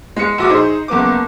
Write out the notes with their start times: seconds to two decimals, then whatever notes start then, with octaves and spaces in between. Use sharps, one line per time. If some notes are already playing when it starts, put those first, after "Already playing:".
0.16 G#3 C#7
0.38 A#1 F#4 D6
0.50 D#4 G#4 C5
0.88 F#1 A#3 B3 D6